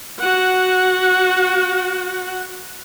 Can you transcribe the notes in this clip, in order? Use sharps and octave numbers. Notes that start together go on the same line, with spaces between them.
F#4 F#5